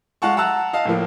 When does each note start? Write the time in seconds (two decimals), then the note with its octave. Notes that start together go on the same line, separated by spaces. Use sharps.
0.22 G#3 F5 F#5 A5 C#6
0.36 E5 F#5 A5 A#5 E6 F#6
0.73 D#5 F5 A5
0.85 A2 F3 A#3